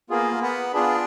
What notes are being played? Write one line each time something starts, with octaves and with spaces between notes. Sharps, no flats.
A#3 B3 F4 G#4
B3
B3 D4 F4 G#4